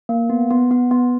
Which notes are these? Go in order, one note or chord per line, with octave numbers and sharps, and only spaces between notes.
A#3
B3
B3
B3
B3